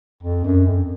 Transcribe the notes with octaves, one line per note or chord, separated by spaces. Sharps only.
F2
F#2
F2